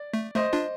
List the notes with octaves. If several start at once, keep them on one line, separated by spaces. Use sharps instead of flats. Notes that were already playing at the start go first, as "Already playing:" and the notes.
Already playing: D5
A3
A3 C5 D#5
D4 F4